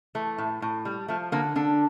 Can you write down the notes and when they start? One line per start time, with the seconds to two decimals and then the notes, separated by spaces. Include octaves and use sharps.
0.15 E3 A3
0.38 A2
0.62 A2
0.85 G3
1.08 F3 A3
1.32 D3 A#3
1.56 D3 D4